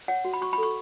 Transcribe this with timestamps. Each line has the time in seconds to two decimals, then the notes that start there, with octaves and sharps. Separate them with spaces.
0.08 C#5 F#5
0.25 F#4
0.33 B5
0.41 F#4 C#6
0.53 B5
0.58 A4 C#6